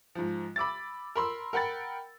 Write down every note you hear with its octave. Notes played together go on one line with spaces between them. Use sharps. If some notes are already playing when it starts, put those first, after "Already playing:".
G#2 F3
B5 D6 E6 A6
A#4 B5 C6 E6
A#4 F#5 G5 B5 A6